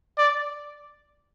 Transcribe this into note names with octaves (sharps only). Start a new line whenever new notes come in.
D5